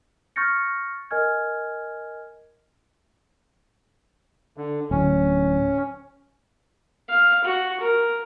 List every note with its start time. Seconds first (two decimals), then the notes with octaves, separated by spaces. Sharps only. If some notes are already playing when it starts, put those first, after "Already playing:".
0.36 C#6 F6 G6 A6 A#6 C#7
1.11 A#4 D#5 G#5 F6 G#6
4.57 D3
4.91 D1 C#4
7.08 F5
7.44 F#4
7.80 A#4